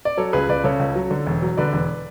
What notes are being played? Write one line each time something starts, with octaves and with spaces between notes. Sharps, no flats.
D5
F#3 A4 C#5
C#2 G#4 B4
C#2 B4 D5
C#3 A4 C#5
C#2
F#3
D3
E1
F#3
D3 B4 D5
E1